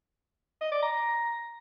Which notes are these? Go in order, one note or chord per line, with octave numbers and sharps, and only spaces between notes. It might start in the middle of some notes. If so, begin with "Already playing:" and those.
D#5
D5
A#5